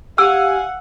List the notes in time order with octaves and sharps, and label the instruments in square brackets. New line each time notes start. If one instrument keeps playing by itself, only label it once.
[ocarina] G4 [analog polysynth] F5 G#5 [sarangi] F#5 [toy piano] E6